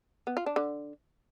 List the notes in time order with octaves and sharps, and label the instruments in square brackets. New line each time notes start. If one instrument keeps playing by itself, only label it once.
[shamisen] B3
F4
D4
D3